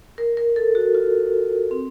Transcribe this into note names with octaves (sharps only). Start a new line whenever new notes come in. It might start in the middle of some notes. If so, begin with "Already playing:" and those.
A#4
A#4
A4
F#4
F4
C4